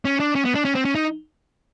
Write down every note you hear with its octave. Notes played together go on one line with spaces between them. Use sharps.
C#4
D4
C#4
B3
D4
C#4
C4
C#4
D#4